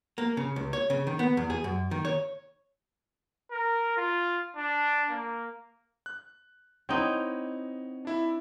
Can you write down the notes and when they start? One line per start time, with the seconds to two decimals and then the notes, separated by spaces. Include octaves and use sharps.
0.18 A#3
0.37 C#3
0.56 C#2
0.73 C#5
0.90 C#3
1.07 D#3
1.19 B3
1.37 E2
1.50 G#4
1.64 F#2
1.91 D#3
2.05 C#5
3.51 A#4
3.97 F4
4.56 D4
5.10 A#3
6.06 F#6
6.89 C4 D#4 E4 C#5 D#5 F#5
8.05 D4 E4 E5